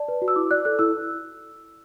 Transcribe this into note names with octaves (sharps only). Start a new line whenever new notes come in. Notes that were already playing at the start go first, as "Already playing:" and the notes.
Already playing: D5 A5
B4
F#4
E6
E4 D6
D5 F#6
A4 F#6
E4 E6